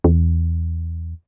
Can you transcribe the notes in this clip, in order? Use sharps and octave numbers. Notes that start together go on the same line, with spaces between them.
E2